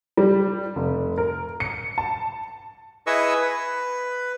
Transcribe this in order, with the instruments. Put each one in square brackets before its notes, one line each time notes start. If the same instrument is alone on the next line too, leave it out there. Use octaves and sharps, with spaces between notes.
[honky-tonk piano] G3
F1
A#4
C#7
A5
[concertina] E4 G#4 B4 D#5 C#6 E6
B4